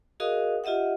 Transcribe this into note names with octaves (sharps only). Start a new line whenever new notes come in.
F#4 G#4 A#4 D#5 F5 D#6
F4 G4 D#5 E5 F#5